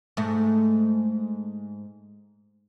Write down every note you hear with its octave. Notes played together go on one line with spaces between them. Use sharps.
G#2 A3